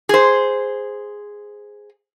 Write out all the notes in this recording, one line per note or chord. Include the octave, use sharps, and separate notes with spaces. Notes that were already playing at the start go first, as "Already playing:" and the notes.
G#4 C5